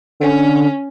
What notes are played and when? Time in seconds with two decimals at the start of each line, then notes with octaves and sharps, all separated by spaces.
0.20 D3 C#4